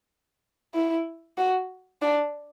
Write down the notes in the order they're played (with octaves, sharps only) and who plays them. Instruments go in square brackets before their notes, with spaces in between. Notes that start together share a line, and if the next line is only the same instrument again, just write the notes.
[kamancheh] E4
F#4
D4